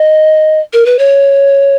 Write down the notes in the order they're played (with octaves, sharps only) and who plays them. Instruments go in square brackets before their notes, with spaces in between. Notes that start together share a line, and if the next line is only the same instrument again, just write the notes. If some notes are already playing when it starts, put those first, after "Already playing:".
Already playing: [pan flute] D#5
A#4
B4
C#5